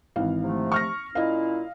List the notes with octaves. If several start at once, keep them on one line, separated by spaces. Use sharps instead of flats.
G#1 E3 F5
C3 F3 A3
C#6 F6 A#6
A#2 C#4 E4 D#5 F5